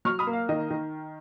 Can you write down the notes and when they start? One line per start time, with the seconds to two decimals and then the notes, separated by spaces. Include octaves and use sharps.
0.05 F#3 C#6 F6
0.19 B5 D#6
0.27 A#3
0.33 F5
0.49 D#3 D#5
0.70 D#3